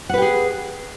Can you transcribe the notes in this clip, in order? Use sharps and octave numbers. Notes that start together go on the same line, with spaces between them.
G4 G#4 B4 F#5